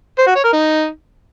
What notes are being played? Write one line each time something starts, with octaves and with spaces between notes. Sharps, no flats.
C5
F#4
C#5
A#4
D#4